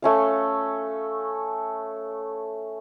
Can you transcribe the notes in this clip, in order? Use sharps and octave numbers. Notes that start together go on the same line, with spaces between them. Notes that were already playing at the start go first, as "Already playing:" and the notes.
A3 C#4 F5